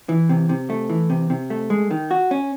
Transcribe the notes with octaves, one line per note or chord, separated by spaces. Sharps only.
E3
C3
C3
A3
E3
C3
C3
A3
G#3
D#3
F#4
C#4